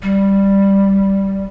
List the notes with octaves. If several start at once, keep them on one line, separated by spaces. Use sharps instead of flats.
G3